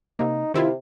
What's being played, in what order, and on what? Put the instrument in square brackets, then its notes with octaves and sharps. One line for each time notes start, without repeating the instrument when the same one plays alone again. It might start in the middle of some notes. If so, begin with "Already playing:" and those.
[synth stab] C3 A#3 [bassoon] D#4
[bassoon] C3 [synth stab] D#3 E4 F4